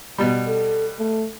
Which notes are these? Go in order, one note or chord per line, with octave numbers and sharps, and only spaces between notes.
B2 G3
A4
A3